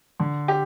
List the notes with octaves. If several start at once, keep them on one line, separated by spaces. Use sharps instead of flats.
D3
G4